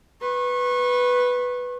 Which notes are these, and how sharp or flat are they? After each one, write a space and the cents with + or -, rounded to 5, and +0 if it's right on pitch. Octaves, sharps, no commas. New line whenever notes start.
B4 +0 C#6 -35